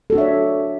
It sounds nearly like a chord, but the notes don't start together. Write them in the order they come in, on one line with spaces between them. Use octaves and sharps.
A4 F#4 D4 E5 C#5